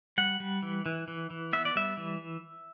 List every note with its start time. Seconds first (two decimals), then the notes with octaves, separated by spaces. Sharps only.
0.18 G3 F#5
0.40 G3
0.63 E3
0.86 E3
1.08 E3
1.30 E3
1.53 B3 E5
1.65 D5
1.76 G3 E5
1.97 E3